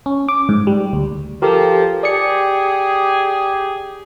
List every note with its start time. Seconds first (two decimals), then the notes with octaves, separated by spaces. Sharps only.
0.06 C#4
0.28 D6
0.49 G#2
0.67 G3
0.93 D2
1.42 F3 G4 A4 A#4
2.03 G4 G#4 D5 C#7